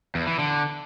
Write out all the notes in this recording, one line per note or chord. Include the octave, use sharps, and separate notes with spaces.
E2
E3
D3